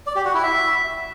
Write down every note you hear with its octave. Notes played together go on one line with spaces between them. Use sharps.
D5
G4
F#4
E4
E5